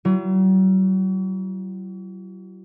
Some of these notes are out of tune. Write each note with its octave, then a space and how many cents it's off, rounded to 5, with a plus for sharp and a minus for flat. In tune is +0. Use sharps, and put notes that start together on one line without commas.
F#3 +40 E4 +45